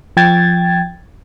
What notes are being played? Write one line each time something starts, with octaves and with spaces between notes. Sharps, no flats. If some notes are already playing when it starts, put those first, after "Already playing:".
F3 G5 G#6 A6